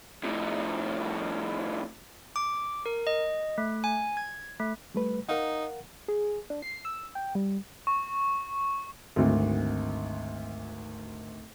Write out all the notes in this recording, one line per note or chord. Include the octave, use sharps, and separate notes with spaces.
F2 A2
D6
A#4
D#5
A3
G#5
G#6
A3
G3 A3 B4
D#4 A#4 F5 F#5
G#4
D4
C7
E6
G5
G3
C#6
G#1 D2